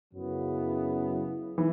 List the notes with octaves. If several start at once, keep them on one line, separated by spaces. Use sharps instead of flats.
F#2 C#3 F#3 B3 E4
E3